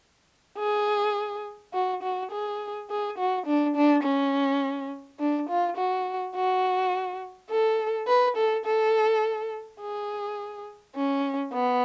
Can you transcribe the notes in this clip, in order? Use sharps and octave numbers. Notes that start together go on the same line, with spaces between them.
G#4
F#4
F#4
G#4
G#4
F#4
D4
D4
C#4
D4
F4
F#4
F#4
A4
B4
A4
A4
G#4
C#4
B3